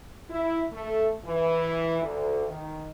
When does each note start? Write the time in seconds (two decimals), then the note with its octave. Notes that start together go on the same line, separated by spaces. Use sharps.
0.30 E4
0.72 A3
1.25 E3
2.02 D2
2.47 D#3